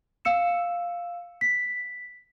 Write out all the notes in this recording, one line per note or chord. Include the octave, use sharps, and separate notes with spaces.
F5 E6 C#7 E7
B6